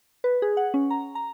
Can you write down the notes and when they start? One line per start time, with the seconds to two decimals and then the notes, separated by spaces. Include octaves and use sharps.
0.24 B4
0.42 G#4
0.57 F#5
0.74 C#4
0.90 A#5
1.15 A#5